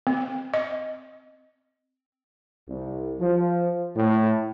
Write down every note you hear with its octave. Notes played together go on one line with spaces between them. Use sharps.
C4
D#5
C2
F3
A2